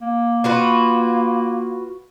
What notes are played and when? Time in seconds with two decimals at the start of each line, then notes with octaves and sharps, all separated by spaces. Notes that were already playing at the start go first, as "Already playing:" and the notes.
0.01 A#3
0.44 F4 F#4 B4